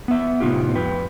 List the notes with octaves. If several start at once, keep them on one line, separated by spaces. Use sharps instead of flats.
B3 E5
A2 C3 B3 D#4 F4 G4
F2 B4 G5